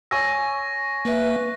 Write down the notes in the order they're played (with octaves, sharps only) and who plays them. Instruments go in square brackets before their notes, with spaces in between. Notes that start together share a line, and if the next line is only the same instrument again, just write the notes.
[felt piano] C#5 G#5 E6 [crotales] C#6 A#6
[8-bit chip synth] A#3 E5 [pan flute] B4